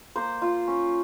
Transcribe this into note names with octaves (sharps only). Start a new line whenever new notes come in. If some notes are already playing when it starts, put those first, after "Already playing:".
A#3 C5
F4
C#4